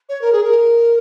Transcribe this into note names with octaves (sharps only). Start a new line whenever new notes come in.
C#5
A#4
G#4
A#4